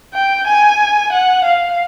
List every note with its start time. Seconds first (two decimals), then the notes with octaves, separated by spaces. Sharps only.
0.14 G5
0.47 G#5
1.12 F#5
1.44 F5